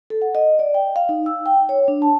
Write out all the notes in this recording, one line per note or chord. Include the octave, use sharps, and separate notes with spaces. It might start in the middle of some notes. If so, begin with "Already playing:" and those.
A4
F#5
D#5
D5
G5
F5
D#4
E6
G5
C#5
D4
A5